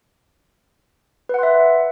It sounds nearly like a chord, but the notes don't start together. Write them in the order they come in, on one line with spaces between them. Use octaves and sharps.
B4 F#5 C6 E5